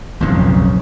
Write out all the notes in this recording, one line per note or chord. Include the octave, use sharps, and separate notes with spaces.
B1 F2 G#2 C#3